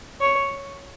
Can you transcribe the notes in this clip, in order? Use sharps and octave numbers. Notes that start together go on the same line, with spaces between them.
C#5